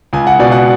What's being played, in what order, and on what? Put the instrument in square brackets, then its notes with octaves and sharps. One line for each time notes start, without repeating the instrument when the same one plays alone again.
[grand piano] C#2 G#5
F#5
B2 D5
F#5